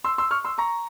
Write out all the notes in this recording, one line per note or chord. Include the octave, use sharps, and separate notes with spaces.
C6 E6
C6 E6
C#6 F6
C6 E6
A#5 C#6